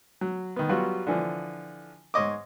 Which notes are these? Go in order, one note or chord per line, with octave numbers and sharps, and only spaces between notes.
F#3
D#3 B3
F#3 G3 B3 F4 F#4
D3 E3 F3
G#2 C#5 D#5 D6